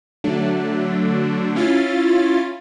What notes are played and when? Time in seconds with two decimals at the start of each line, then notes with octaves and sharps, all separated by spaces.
0.24 D3 F#3 A3 D4
1.55 C#4 E4 F4 A6